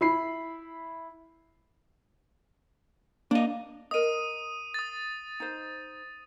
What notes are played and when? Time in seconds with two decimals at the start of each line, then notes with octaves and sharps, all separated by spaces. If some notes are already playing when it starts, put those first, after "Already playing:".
0.01 E4 B5 C7
3.31 A#3 D4 D#5
3.91 A#4 D#5 D#6 D#7
4.74 D#6 A6
5.40 D#4 C5